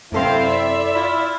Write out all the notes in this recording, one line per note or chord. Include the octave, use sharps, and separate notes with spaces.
F#2 C3 C4 E4 A4 F5 C6
D5 E5
E4 F4 B5